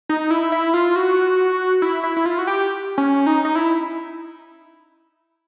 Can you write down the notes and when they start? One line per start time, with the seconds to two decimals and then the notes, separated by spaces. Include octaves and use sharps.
0.09 D#4
0.31 E4
0.52 E4
0.74 F4
0.96 F#4
1.82 E4
2.03 E4
2.17 E4
2.26 F4
2.39 F#4
2.47 G4
2.98 C#4
3.27 D#4
3.45 D#4
3.55 E4